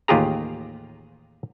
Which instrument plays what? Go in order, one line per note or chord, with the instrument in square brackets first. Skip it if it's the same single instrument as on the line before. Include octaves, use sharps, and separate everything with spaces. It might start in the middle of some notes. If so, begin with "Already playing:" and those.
[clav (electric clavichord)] A1 D#2 F4 G4 G#4 A#5